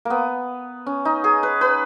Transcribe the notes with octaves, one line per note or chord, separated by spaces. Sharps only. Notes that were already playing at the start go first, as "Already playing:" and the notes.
A#3 B3
C#4
D#4
G#4
B4
B4